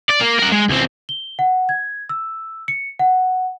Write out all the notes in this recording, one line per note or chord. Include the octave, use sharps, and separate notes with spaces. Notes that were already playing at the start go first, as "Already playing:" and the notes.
D5
A#3
A#4 F#5
G#3
C#2 C4
G7
F#5
G#6
E6
C#7
F#5